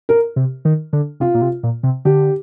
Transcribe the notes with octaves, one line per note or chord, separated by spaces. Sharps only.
A#4
C3
D#3
D3
C3 F4
A#2
C3
A#2
C3
D3 G4